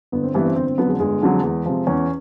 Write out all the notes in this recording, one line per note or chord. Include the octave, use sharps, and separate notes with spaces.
G1 B3
C4
G2 E3 G3 B3
C4
G1 C4
C4
F2 D3 F#3 B3
G#3
G1 G#3
F2 D3 F#3
E2
C3 F3
E2 C#4